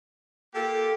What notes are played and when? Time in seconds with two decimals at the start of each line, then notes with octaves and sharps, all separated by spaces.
0.55 A#3 F4 G4 A4